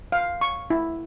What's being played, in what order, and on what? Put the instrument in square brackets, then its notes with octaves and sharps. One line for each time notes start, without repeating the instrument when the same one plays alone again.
[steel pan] F5
C#6
E4